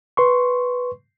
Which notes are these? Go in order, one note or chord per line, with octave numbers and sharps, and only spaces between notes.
B4 C6 C#6